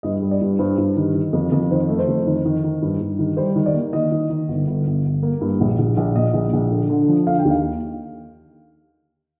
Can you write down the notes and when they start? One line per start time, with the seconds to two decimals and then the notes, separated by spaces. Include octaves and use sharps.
0.03 G2 D#5
0.22 G3
0.31 D5
0.41 G2
0.59 G2 C5
0.78 G2
0.96 D#3
1.15 D#3
1.33 F2
1.52 F2
1.71 D#3 C5
1.89 A3
1.99 C5
2.08 F2
2.27 D#3
2.45 D#3
2.64 D#3
2.82 G2
3.00 G2
3.19 D#3
3.37 G3 C5
3.56 D#3
3.66 D5
3.74 A#3
3.93 D#3 D#5
4.12 D#3
4.30 D#3
4.48 G1
4.67 G1
4.86 G1
5.05 G1
5.23 A#3
5.41 G2
5.60 A#1
5.79 A#1
5.97 A#1
6.16 A#2 D#5
6.33 A#1
6.53 A#1
6.71 D3
6.90 D3
7.08 F3
7.27 D3 F5
7.39 G5
7.45 D#2
7.51 F5